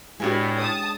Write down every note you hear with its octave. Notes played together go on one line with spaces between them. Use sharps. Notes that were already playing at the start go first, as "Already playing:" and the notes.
A2 G#3 B3 D4 F#4 G4 G#5
C#5 A5 D#6